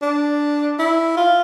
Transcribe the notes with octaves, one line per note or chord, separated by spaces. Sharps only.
D4
E4
F4